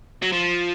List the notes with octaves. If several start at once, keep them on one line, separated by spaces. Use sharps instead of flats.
F#3
F3